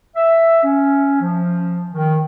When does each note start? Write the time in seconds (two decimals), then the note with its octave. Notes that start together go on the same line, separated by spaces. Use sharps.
0.16 E5
0.64 C#4
1.21 F3
1.92 D#3